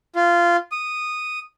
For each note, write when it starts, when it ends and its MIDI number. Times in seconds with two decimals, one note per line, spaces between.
0.16 0.57 65
0.72 1.39 87